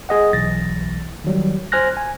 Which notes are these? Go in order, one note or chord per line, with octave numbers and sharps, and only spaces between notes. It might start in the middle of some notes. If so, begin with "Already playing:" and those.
G#4 D#5 F#5
B1 E3 A6 A#6
D#3 F#3 G3
C5 G#5 F6 F#6 A#6
G#5